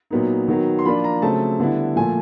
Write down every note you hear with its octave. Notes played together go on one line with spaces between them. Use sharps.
A#2 F#3 B3 D#4
D#3 F#3 B3
C6
F3 A#3 D4 F4 B5
A#5
C#3 F#3 A3 C4 A5
D3 G3 B3 E4
A#2 F3 A3 G#5